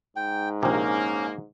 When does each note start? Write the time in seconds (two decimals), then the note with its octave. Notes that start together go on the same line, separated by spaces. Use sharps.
0.16 G#2 G5
0.63 A#1 C3 A#3 C#4 D#4